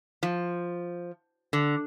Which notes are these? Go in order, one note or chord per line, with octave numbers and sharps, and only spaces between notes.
F3
D3